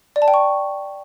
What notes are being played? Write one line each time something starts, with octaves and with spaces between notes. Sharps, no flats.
D5
A5
G5
C#6